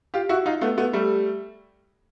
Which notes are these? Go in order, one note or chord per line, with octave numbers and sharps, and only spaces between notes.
F4 G4
E4 F#4
D#4 F4
A3 B3
A3 B3
G3 A3